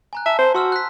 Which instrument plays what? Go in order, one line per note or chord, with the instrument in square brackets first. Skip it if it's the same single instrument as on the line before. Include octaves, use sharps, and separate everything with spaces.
[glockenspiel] G#5 A#5 F#6
[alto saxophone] E5 [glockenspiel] A5
[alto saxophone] C5
[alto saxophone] F#4 [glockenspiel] C6 E6 F6
[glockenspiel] F#6 B6